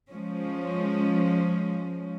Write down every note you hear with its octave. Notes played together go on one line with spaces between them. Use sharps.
F3 G#3 C#4